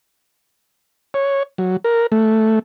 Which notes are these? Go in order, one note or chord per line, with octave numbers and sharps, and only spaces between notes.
C#5
F#3
A#4
A3